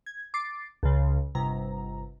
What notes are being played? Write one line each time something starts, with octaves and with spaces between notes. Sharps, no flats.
G#6
D6 A6 C7
C#2 C#3
G1 C3 A#5